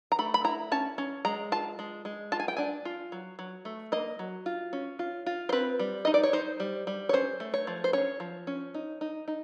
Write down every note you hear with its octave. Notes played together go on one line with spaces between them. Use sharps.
A#5
A3 B5
B5
E4 A#5
C#4 A5
C#4
G#3 A#5
F4 A5
G#3
G#3
F4 A5
G#5
G5
D4 G#5
F4
F#3
F#3
A3
A#3 D#5
F#3
F4
C#4
F4
F4
C5
C4 B4
G3
D#4 D#5
D5
C#5
D#4 C5
G3
G3
C#5
C#4 C5
A3
C#5
F3
C5
C#4 C#5
F3
C#4
D#4
D#4
D#4